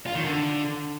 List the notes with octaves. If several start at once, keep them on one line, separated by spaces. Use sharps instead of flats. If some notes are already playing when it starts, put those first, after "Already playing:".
F4
D#3
D3